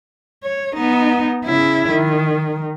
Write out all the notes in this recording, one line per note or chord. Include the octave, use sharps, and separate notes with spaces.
C#5
B3 D#4
C#3 E4
D#3